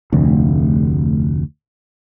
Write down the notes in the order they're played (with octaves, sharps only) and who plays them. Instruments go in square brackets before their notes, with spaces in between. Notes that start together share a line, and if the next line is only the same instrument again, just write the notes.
[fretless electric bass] F1 D2